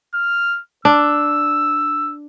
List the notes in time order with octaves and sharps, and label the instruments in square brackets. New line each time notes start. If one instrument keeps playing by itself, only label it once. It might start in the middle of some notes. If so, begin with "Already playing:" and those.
[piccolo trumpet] F6
[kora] D4 [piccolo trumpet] E6